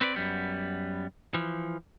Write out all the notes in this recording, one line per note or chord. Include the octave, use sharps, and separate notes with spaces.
C4 B4 C#5 D5
F#2 G3 B3
E3 F3